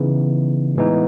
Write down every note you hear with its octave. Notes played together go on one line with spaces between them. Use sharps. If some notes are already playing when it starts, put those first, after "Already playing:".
Already playing: C#3 E3 B3 D#4
A2 E3 G#3 B3 D#4